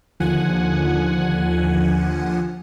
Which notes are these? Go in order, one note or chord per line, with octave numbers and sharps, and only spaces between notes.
D#2 D3 F3 F#5 G#5